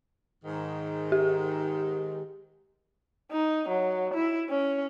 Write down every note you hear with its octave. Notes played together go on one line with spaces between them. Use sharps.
G#2 D#3
G4
D#4
F#3
E4
C#4